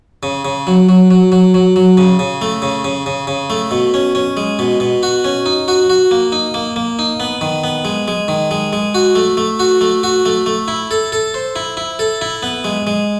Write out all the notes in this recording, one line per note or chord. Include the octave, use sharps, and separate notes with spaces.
C#3
C#3
F#3
F#3
F#3
F#3
F#3
F#3
C#3
C#3
A3
C#3
C#3
C#3
C#3
A3
B2
C#4
C#4
G#3
B2
B2
F#4
C#4
D#4
F#4
F#4
A#3
D#4
A#3
A#3
D#4
B3
D#3
B3
G#3
G#3
D#3
G#3
G#3
F#4
A3
A3
F#4
A3
F#4
A3
A3
E4
A4
A4
C5
E4
E4
A4
E4
B3
G#3
G#3